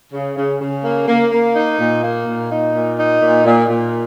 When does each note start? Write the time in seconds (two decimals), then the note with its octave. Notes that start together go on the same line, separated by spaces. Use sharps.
0.13 C#3
0.37 C#3
0.60 C#3
0.84 A#3
1.07 A#3
1.32 A#3
1.55 D#4
1.79 A#2
2.02 A#3
2.26 A#2
2.50 D#4
2.74 A#2
2.97 D#4
3.21 A#2
3.44 A#2
3.68 A#2